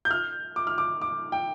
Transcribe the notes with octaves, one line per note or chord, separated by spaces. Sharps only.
G6
F6
D6
F6
D6
D6
G5